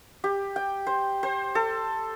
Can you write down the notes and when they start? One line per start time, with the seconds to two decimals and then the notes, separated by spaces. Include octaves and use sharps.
0.24 G4
0.56 G5
0.87 C5
1.23 C5
1.55 A4